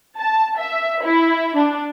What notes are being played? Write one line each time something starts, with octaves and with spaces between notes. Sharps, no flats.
A5
E5
E4
D4